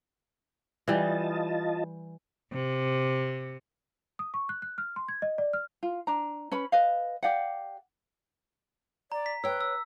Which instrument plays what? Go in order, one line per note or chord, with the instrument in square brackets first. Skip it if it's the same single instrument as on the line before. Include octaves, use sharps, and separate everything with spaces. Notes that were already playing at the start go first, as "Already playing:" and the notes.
[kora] E3 G3 [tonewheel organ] F4 D#5 A5
[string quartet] C3
[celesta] D#6
C#6
F#6
F#6
F6
C6
G#6
D#5
D5
F6
[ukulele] F4
D4 A#5
C#4 B4 B5
B4 D#5 F5
G4 D5 F5 F#5
[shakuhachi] D5 [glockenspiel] A#5
[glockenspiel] B6
[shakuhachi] B4 [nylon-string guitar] C#5 G5 [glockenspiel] E6
[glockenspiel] E6